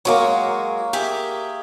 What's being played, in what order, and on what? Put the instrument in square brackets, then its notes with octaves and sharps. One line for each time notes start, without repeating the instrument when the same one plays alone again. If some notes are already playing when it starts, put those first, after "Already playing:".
[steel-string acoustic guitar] F#3 G#3 F#4 [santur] A#3 C#6
[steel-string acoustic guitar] G4 G#4 E5